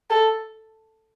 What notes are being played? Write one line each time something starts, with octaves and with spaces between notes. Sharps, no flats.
A4